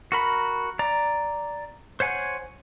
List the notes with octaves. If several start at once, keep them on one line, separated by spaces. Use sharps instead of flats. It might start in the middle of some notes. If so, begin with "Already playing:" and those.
F#4 A#4 B5
D5 A#5
C5 C#5 F#5 G#5